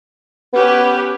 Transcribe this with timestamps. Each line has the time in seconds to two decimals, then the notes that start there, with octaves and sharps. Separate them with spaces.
0.53 B3 C#4 G4 B4